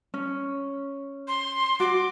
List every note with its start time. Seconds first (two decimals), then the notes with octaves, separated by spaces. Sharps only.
0.14 C#4
1.28 C6
1.80 F#4 D6